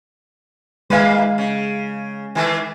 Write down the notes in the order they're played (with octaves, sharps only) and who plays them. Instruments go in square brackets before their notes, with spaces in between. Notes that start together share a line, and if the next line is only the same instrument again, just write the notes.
[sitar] D#3 A#3 B4 [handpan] G#3 F5
[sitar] C#3
D#3 E3 A3